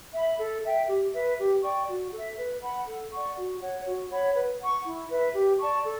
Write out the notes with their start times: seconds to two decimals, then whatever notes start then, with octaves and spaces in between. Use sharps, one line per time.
0.14 E5 B5
0.39 A4
0.63 E5 G5
0.88 G4
1.14 B4 E5
1.38 G4
1.63 D5 G5 C#6
1.88 F#4
2.12 A4 E5
2.37 B4
2.62 F#5 B5
2.87 A4
3.12 D5 F#5 C#6
3.36 F#4
3.61 C#5 F#5
3.86 F#4
4.10 C#5 F#5 B5
4.35 B4
4.60 F#5 C#6
4.85 E4
5.10 B4 E5
5.34 G4
5.59 D5 A5 C#6
5.84 A4